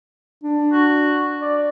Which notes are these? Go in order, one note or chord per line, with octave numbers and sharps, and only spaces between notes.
D4
F#4
D5